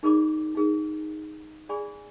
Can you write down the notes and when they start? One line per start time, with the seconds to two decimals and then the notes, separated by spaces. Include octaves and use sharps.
0.03 D#4 G#4 A#4 D5 B5 D6
0.55 D#4 G#4 A#4
1.69 G#4 D5 G#5 B5